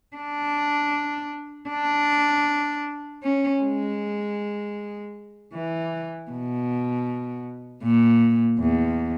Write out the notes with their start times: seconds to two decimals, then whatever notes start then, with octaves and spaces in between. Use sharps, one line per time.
0.16 D4
1.69 D4
3.23 C#4
3.62 G#3
5.53 E3
6.31 B2
7.84 A#2
8.60 E2